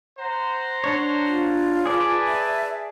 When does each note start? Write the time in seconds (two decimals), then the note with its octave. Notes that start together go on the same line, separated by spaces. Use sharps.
0.18 C5 F#5 A#5
0.84 D4 C#5
1.26 F4
1.86 G#4 B4 D5 G#5 A5
2.27 E5